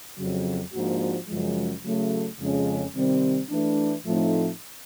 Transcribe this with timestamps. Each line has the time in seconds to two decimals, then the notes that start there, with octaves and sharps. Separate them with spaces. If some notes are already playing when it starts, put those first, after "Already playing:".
0.17 F2 C#3 F#3
0.72 G#2 F3 A#3 D4 F#4
1.28 F#2 C#3 F3 G#3
1.83 C#3 F#3 A3
2.40 F2 C#3 F3 G#3 C#4
2.95 C3 D#3 G3 C4
3.50 E3 A3 D4
4.06 A2 F3 A3 C4 D#4